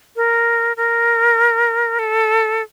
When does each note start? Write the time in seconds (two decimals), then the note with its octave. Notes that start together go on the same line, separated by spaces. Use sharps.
0.16 A#4
0.77 A#4
1.99 A4